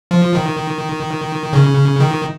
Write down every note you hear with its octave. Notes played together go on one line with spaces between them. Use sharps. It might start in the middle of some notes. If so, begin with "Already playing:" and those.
F3
D#3
C#3
D#3